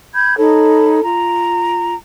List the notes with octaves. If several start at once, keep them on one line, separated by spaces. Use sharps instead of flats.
B5 G6 G#6
D#4 A4 C#5 B5
F4 A#5